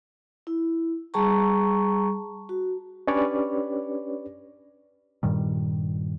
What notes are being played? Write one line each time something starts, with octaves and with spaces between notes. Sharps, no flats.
E4
G3 G#4 A5 A#5 C#6
F#4
C#4 D4 G4 B4 C#5 D5
G2 A#2 D#3 G3